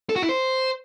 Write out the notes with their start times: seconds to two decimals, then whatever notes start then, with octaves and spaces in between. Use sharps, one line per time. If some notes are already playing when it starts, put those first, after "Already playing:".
0.09 A4
0.16 F#4
0.22 E4
0.29 C5